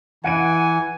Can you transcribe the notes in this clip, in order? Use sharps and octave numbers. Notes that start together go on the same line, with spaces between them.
E3 F#5 G#5 D7 D#7